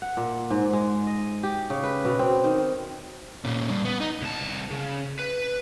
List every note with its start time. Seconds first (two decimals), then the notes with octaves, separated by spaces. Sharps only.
0.02 F#5
0.17 A#2
0.50 G#2
0.73 G#3
1.07 D#5
1.43 G4
1.70 C#3
1.83 B4
2.05 B2
2.19 C4
2.44 D#3
3.45 A#2 C#4
3.70 G2
3.85 B3
4.00 D#4
4.22 C2 A5
4.71 C#3
5.20 B4